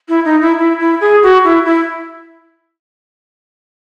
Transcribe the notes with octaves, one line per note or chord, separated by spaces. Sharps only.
E4
D#4
E4
E4
E4
G#4
F#4
E4
E4